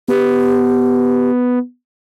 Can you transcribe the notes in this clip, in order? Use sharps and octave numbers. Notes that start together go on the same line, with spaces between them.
B3 G4